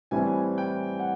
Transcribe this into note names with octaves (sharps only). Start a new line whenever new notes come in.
A2 E3 G3 C4 G#5
G5
F#5